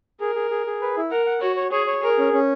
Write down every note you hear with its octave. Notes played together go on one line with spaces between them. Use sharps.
G#4 A#4
G#4
G#4
G#4
B4
E4
A#4 F#5
F#5
F#4 C#5
C#5
G#4 C#5
C#5
G#4 A#4
C#4
C#4